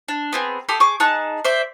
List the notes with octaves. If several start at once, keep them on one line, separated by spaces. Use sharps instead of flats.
D4
B3 C4 G#4
G4 A4 C6 D#6
G#4 C#6 D6
D#4 G#4 A5 F#6
C5 D5 E5